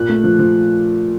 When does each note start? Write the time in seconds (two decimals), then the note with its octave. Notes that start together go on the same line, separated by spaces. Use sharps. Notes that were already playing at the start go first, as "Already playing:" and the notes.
Already playing: A#2 F#6
0.09 A3
0.24 F3
0.39 F3